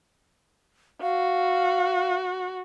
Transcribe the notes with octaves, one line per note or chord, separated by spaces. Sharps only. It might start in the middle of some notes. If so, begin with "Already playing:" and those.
F#4 F5